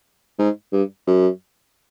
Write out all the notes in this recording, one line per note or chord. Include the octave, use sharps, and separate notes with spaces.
G#2
G2
F#2